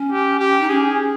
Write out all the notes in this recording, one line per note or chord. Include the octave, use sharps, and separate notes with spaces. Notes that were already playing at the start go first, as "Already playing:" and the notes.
Already playing: C#4
G4
G4
D#4
C#4 G#4